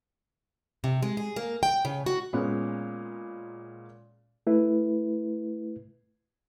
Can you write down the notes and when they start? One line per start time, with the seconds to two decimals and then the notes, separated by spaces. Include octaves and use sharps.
0.84 C3
1.03 G#3
1.17 G#4
1.36 A#3
1.63 G5
1.85 C#3
2.06 F#4
2.33 A#2 G#3 B3 C#4
4.47 A3 E4 B4